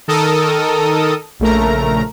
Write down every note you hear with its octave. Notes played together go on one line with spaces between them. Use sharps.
D#3 A4 A#4 D#6
A#1 C#3 A3 A#4 A#5